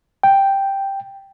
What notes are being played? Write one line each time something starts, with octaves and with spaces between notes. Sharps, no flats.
G5